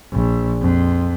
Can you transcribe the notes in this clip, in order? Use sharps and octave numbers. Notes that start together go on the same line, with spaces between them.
A#1
F2